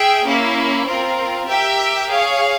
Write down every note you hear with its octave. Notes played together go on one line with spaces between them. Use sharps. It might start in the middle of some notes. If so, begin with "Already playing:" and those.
Already playing: G#4 E5 G5
A#3 C#4 E4
C4 F4 A#4
G4 A#4 E5 G5
G#4 C#5 F5